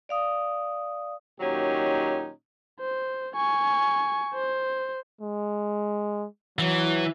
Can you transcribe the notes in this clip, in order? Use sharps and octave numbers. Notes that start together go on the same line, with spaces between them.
D5 F5 D#6
A#2 D#3 F#3 C#4 D#4 G4
C5
G#5 C#6
C5
G#3
E3 F#3